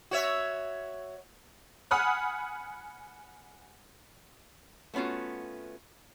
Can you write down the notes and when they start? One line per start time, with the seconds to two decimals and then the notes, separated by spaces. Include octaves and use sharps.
0.11 F#4 C#5 E5
1.91 F#5 G#5 B5 D#6 F6 F#6
4.94 A3 B3 C#4 F4 F#4